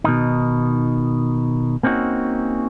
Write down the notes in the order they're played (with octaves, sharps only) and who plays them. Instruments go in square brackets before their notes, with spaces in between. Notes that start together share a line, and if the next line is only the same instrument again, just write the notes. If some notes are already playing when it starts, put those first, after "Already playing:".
[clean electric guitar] B2 D#3 D#4
A#3 C4 C#4 D#4 F#4